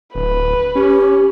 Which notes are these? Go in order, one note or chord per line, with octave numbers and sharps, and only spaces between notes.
D1 B4
C#4 G4